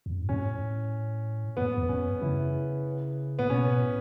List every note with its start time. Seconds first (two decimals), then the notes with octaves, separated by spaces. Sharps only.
0.06 E2
0.13 F#2
0.21 G#2
0.29 A2 C#4
1.57 F#2 B3
1.78 E2
1.89 F#2 C#4
2.22 C#3 E4
3.39 A2 B3
3.50 B2 C#4
3.82 A2